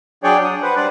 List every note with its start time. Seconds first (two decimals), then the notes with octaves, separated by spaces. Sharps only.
0.24 F#3 D4 G#4 C#5 D5 G5
0.44 D#6
0.62 B4 C5 F#5
0.76 G3 D4 C5 D5